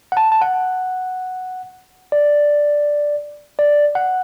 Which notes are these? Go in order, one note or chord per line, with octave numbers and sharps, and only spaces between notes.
F#5
A5
A5
F#5
D5
D5
F#5